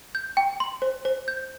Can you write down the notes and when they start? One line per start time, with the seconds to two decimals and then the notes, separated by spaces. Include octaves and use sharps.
0.15 G6
0.37 G5
0.60 C6
0.82 C5
1.05 C5
1.28 G6